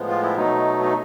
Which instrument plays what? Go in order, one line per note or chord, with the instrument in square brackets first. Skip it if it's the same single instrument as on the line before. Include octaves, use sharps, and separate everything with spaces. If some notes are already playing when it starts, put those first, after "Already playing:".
Already playing: [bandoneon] A2 F3 G#3 B3
F4
E4
B2 F#3 A3 D#4
D#4